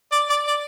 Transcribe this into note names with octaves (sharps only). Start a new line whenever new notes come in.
D5
D5
D5